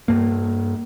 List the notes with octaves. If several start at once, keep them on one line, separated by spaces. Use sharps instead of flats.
G2 A#3